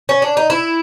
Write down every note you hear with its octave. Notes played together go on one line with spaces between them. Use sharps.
C#4
D4
D#4
E4